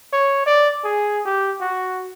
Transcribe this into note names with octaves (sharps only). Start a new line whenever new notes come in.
C#5
D5
G#4
G4
F#4